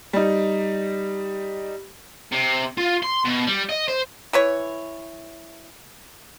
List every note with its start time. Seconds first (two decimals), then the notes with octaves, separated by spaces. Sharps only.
0.13 G3 D#4
2.32 C3
2.78 F4
3.03 C6
3.25 B2
3.47 G3
3.69 D#5
3.88 C5
4.33 E3 B4 C#5